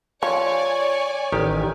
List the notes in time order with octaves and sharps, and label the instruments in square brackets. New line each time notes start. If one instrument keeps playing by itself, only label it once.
[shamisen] F3 [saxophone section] C#5 [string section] D5 G#5
[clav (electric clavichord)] A1 D#3 G4